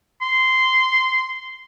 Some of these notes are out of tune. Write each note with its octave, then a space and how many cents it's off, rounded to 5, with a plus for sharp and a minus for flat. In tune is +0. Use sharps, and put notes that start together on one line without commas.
C6 -10